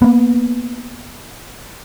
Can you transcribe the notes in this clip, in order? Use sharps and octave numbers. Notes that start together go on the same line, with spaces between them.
A#3 B3